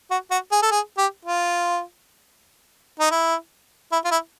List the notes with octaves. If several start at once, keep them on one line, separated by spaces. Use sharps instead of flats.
F#4
F#4
G#4
A4
G#4
G4
F4
D#4
E4
E4
F4
E4